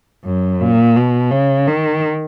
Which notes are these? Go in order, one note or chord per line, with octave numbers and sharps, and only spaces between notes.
F#2
A#2
B2
C#3
D#3